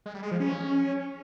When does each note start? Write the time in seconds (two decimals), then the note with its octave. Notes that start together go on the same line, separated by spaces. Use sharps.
0.06 G#3
0.14 G3
0.23 G#3
0.31 F3
0.40 C#4